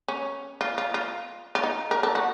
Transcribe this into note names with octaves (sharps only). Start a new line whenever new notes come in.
C#4
F4
F4
F4
F4
D#4
A#4
A4
F#4